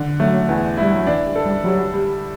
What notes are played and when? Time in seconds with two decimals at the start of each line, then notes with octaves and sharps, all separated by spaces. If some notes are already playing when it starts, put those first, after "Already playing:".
Already playing: D3
0.20 F#3 A3
0.49 E2
0.77 G3 E4
0.94 F#3
1.07 E3 D4
1.26 G3
1.36 A4
1.46 G3
1.64 F#3 G3
1.94 G3